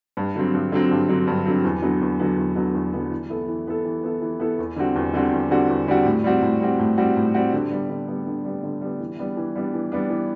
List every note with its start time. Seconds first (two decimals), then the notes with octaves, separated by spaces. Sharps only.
0.17 G2
0.36 D3 F#3 C4
0.54 G2
0.72 D3 F#3 C4
0.91 G2
1.09 D3 F#3 C4
1.27 G2
1.45 D3 F#3 C4
1.65 E2
1.82 D3 F#3 B3
2.01 E2
2.19 D3 F#3 B3
2.38 E2
2.56 D3 F#3 B3
2.74 E2
2.93 D3 F#3 B3
3.11 E3
3.29 B3 E4 A4
3.48 E3
3.67 B3 E4 A4
3.85 E3
4.03 B3 E4 A4
4.22 E3
4.40 B3 E4 A4
4.59 E2
4.76 D3 G3 C4 F#4
4.95 E2
5.14 D3 G3 C4 F#4
5.32 E2
5.50 D3 G3 C4 F#4
5.69 E2
5.87 D3 G3 C4 F#4
6.06 A2
6.24 G3 C4 F#4
6.42 A2
6.61 G3 C4 F#4
6.79 A2
6.98 G3 C4 F#4
7.17 A2
7.35 G3 C4 F#4
7.53 D3
7.71 G3 B3
7.90 D3
8.08 G3 B3
8.27 D3
8.45 G3 B3
8.63 D3
8.81 G3 B3
9.00 E3
9.19 G3 B3 D4
9.37 E3
9.56 G3 B3 D4
9.74 E3
9.92 G3 B3 D4
10.10 E3